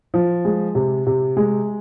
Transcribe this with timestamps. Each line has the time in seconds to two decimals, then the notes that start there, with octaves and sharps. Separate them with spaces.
0.14 F3
0.45 G#3
0.75 C3
1.07 C3
1.37 G#3